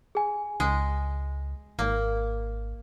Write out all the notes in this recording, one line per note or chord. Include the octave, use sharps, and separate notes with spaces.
G#4 G#5
C#2 G#3
G#1 A#3